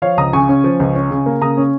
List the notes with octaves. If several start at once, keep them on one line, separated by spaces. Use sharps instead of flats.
F3 C#5 F5
C#2 A#5 D#6
C#3 G#5 C#6
C#4
F3
C#2
C#4
C#3
A#3
C#3 A#5 D#6
C#4